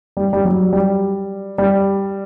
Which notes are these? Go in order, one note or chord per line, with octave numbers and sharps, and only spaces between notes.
G3
G3
F#3
G3
G3